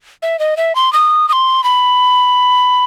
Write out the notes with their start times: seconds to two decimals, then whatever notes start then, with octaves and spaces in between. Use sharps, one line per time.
0.23 E5
0.39 D#5
0.57 E5
0.75 C6
0.93 D#6
1.29 D#6
1.33 C6
1.64 B5